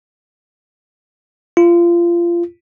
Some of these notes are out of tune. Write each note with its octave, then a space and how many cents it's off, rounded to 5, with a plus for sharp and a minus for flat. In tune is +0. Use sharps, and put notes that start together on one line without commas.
F4 -25